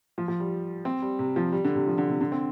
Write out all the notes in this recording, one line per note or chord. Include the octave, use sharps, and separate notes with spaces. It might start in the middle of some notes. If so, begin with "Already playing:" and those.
F3
F3
G3
C4
G3
C3
F3
G3
D3
C3
F3
D3
C3
D3
C4